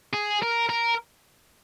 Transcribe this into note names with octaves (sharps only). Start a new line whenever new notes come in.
G#4
A#4
A#4